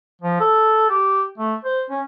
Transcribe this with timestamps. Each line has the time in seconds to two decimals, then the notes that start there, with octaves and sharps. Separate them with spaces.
0.22 F3
0.40 A4
0.90 G4
1.38 A3
1.65 C5
1.90 C#4